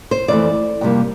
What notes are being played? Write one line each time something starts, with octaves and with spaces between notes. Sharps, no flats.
C5
F2 E3 A3 D5
F2 C3 G3 A#3